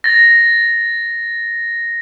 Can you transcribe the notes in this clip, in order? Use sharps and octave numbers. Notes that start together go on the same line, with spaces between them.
A6 A#6